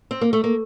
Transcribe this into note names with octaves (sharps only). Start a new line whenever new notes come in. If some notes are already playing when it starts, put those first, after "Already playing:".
C4
A#3
A3
A#3